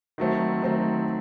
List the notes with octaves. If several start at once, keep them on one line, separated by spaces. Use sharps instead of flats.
D#3 F#3 A3 C4
D#3 F#3 A3 C4